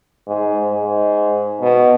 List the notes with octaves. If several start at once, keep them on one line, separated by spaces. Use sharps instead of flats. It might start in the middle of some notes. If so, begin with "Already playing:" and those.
G#2
G#2
B2